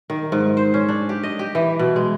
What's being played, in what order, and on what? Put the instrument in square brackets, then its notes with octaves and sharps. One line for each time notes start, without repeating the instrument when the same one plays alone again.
[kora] D#3
G#2
C5
C#4
D4
G4
D#5
G4
E3
B2
G#3